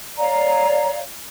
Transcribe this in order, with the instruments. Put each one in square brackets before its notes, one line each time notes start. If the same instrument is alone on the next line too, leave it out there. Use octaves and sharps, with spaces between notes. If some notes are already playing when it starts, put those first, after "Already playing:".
[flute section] C#5 D5 F5 A#5